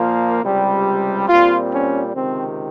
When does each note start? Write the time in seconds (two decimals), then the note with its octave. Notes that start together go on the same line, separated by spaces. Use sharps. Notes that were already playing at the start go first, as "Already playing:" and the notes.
Already playing: A#2 F3 A#3
0.43 C#2 C3 G3
1.28 A#2 G3 C4 F4
1.72 C#4
2.15 C#2 C3 D#3 C4